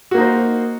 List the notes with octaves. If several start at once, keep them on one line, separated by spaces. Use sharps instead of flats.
A#3 D#4 F#4 C5